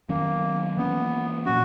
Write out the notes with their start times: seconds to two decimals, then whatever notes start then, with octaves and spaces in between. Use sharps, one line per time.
0.09 D#3 F#3 A#3 C#4
0.77 E3 A#3 B3 C#4
1.46 A#2 F#3 C#4 F#4